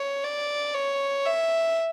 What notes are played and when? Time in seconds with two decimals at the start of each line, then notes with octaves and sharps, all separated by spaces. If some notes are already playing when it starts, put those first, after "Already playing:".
Already playing: C#5
0.24 D5
0.74 C#5
1.26 E5